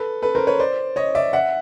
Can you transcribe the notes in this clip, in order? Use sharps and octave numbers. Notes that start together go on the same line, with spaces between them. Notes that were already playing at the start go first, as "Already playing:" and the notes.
Already playing: A4 B4
A4 B4
A#4 C5
B4 C#5
C5 D5
C#5 D#5
D5 E5
E5 F#5